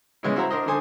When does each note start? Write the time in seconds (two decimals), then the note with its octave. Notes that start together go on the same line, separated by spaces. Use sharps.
0.23 C#3 E3 G#3 B3 C#4 E4
0.36 E4 F#4 C5 E5 A#5
0.51 D4 A#4 C5 D#5
0.66 D3 D4 A4 C5 G#5 D#6